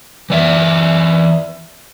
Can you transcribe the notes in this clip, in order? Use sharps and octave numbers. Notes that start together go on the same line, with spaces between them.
E3 D5 E5